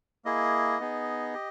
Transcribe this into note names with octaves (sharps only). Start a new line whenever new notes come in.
A#3 E4 G#4 D#5
B3 D#4 G#4
G4